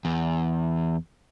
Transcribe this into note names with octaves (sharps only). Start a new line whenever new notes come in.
E2